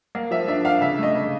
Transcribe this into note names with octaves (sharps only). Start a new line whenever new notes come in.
A#3
F3 E5
D4 E5
D4 F5
C#3 E5
A3 D#5
C#3